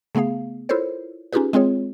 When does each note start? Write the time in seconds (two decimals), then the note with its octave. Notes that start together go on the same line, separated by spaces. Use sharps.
0.15 C#3 A3 B3 G#4 F5
0.69 E4 F4 A4 A#4 C5 C#5
1.33 C#4 D#4 F4 G4 G#4 B4
1.53 G#3 C4 F4 G#4 C#5